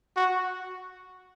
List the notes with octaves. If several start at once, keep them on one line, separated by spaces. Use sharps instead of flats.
F#4